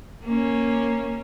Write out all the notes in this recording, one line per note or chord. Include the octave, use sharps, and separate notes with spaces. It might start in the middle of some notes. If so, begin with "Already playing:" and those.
A#3 C#4